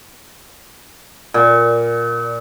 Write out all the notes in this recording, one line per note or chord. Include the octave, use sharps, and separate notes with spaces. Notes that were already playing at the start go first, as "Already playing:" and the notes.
A#2